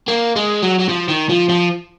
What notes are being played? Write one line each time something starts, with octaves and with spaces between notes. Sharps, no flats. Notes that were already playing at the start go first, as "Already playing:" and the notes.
A#3
G#3
F#3
F#3
F3
D#3
F3
F3